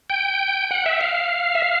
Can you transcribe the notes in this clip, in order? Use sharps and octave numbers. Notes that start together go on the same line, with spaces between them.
G5
F#5
E5
F5
E5
F5